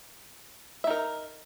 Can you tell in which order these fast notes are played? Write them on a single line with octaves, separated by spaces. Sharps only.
E5 D#4 A#4